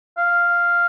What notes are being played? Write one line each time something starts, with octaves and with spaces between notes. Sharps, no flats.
F5